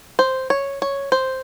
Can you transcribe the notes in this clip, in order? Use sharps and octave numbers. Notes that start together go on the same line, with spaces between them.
C5
C#5
C#5
C5